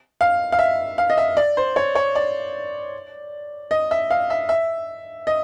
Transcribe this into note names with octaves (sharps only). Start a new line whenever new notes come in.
F5
F5
E5
F5
D#5
E5
D5
C5
C#5
C#5
D5
D#5
E5
F5
E5
E5
D#5